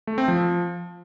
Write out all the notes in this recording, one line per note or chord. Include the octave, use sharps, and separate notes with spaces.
A3
C4
F3